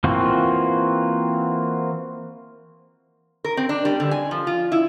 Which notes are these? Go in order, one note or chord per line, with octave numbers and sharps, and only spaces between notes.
E3 A#3 C4 F4 F#4
A#4
C4
D4
G3
D3
G#5
F3
F4
E4